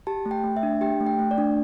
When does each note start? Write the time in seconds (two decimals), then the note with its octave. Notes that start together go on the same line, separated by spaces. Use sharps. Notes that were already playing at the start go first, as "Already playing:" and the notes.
0.07 G4 A5
0.26 A3
0.31 G5
0.44 A3
0.57 E5
0.63 D4
0.81 G4 G5
1.00 A3
1.06 G5
1.19 A3
1.31 D5
1.38 D4